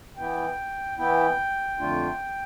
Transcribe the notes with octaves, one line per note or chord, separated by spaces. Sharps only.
E3 B3 E4 G5
E3 B3 E4 G5
F2 D3 A3 D4 F4